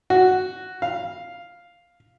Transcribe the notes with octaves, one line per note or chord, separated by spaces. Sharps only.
F#4
F5